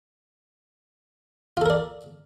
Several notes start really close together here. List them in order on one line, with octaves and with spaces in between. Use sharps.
F4 A4 A#4 D5